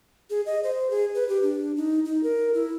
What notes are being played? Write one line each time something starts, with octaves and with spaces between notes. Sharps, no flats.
G#4
D#5
C5
G#4
B4
G4
D4
D#4
D#4
A#4
E4